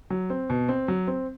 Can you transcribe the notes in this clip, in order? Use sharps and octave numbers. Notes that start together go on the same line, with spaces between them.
F#3
C4
B2
C4
F#3
C4